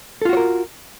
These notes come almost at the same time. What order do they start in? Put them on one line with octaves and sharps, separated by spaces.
A4 F4 F#4 C#5 A#4